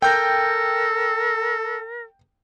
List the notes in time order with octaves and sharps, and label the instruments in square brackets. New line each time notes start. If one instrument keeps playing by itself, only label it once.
[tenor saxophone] A4 [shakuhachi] A#4 [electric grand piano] G5 G6